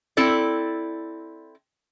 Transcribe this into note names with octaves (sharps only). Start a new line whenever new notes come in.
C4 E4 A4 D5